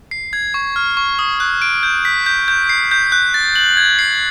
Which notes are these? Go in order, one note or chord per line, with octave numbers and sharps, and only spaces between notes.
C7
G#6
C#6
F6
C#6
D#6
F#6
D7
G6
B6
G6
G6
C7
G6
F#6
A6
F#7
G#6
C7